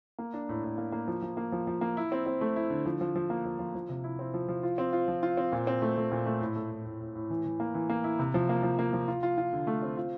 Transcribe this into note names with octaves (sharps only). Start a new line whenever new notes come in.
A#3
D4
A2
A2
A#3
A#3
F3
F3
A#3
F3
F3
A#3
E4
C4
C4
A3
E4
D3
F3
F3
F3
A#3
F3
F3
F3
C3
E4
C4
F3
F3
F4
C4
F4
F3
F4
C4
A#2
C4
A3
A3
A#2
A3
A2
A3
A2
A2
A2
A2
E3
E3
A#3
E3
A#3
E4
C3
F3
A#3
F3
A#3
F3
F4
F4
F4
D3
A3
C4
F4